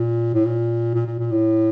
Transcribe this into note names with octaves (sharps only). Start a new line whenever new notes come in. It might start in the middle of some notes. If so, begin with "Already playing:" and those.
Already playing: A#2
A2
A#2
A#2
A#2
A#2
A2